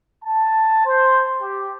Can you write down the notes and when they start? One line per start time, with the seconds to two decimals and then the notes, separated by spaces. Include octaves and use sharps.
0.23 A5
0.86 C5
1.41 G4